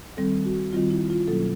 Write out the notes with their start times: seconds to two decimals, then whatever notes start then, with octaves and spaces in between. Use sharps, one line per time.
0.17 D#3 G3 C4 A4
0.45 F#4
0.73 D#3 G3 C4 F4
0.91 E4
1.10 F4
1.28 B2 F#3 A#3 C#4 A4